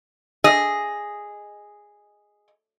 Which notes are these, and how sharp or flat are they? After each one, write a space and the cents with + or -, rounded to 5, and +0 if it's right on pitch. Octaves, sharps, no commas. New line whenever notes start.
G#4 -5 D#5 +0